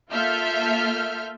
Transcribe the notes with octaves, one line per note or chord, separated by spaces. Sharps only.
A#3 F4 A4 E5 F6 G6